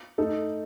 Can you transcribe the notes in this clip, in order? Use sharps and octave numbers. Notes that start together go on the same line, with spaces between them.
A3 D#4 A4